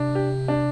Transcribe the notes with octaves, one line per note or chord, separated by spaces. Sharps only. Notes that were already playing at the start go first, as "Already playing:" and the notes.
Already playing: C3 D4
G4
D4